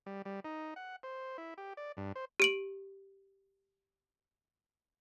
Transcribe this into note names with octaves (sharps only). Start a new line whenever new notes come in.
G3
G3
D#4
F#5
C5
E4
G4
D5
G2
C5
G4 D7 F#7